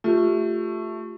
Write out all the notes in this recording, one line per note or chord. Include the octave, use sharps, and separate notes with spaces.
A3 F4 G4